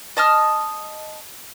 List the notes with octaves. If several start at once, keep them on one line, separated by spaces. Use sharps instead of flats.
D#5 A5 D#6 F6